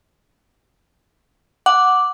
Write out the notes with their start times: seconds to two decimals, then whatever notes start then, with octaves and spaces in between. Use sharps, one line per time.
1.66 F#5 D6